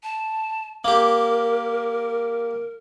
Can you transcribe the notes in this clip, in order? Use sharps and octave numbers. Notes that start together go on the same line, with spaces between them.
A5
A#3 G4 A#4